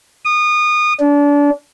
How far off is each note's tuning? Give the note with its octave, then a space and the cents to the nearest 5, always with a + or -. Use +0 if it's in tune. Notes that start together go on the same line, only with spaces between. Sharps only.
D#6 -25
D4 -30